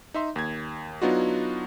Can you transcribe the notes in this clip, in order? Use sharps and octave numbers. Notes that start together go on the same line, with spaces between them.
D#4 E5 C6
D#2 G#6
F#3 B3 D4 D#4 F4 F#4